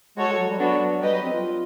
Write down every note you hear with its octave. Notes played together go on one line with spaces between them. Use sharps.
G#3 F#4 A4 C#5
G#3
F#3
G3
F#3 B3 D4 F#4 A4
G3 G4 B4 D#5
F#3
C4
F4